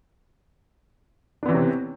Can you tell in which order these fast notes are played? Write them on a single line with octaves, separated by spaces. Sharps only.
D4 B3 E3 C#4 C3